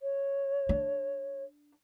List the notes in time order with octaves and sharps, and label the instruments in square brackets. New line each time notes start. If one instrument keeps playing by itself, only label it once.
[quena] C#5
[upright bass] D4